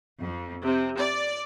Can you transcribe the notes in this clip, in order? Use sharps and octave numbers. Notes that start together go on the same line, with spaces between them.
F2
C3
D5